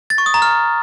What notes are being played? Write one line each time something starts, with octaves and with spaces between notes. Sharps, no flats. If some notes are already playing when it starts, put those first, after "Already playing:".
A6
C#6
D#6
A#5
F6